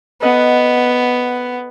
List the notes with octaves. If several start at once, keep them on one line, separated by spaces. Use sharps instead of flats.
B3 A4 D#5 F#5